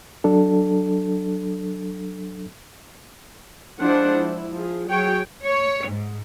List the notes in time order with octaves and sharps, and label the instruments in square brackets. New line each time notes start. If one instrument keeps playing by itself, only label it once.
[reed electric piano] F#3 D4 A4
[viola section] F3 G#3 D4 E4 C5 F#5
E4
F3 G#4
F#3 G#4 C#5 G5
[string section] C#5
G#2